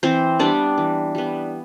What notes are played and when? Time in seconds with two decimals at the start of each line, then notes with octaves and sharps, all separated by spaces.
0.03 E3 C4 C5
0.39 G3 B3 D4 D5
0.78 E3
1.15 G3 B3